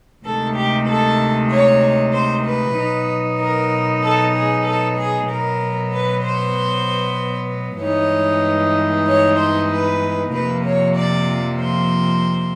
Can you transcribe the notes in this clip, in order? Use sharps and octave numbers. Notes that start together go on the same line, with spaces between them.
D2 C3 D#3 G#3 A4
G4
A4
C#5
C5
B4
B2 F#3 B3 D#4
A#4
A4
G#4
A4
G#4
B2 F#3 B3 A#4
B4
C5
G2 E3 G#3 B3 D#4 C#5
C#5
C5
B4
F2 C3 F3 A#3 B4
C#5
D5
C5